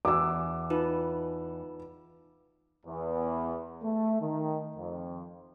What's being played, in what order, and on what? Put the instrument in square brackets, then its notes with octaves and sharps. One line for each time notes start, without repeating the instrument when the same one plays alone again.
[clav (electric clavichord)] E2 E3 [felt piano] D6 E6
[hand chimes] D#4 F4 B4
[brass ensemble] E2
A3
D#3
F2